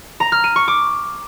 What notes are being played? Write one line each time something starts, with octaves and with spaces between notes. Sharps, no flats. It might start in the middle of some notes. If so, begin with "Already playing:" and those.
A#5
F6
D#7
C#6
D6